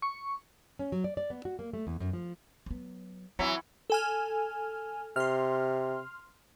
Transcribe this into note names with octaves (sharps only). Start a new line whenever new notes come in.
C#6
C#4
F#3
D5
D5
B3
F#4
A#3
A3
E2
F#2
F3
F#3 B3
E3 F#3 C4 E4 B5
A4 G#5 F6
C3 C6 F6